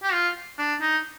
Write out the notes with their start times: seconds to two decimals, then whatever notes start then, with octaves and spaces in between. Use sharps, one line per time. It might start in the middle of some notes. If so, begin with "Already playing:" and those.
0.03 G4
0.13 F4
0.58 D4
0.81 D#4